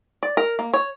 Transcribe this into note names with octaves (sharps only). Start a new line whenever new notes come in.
D5
A#4
A#3
C#5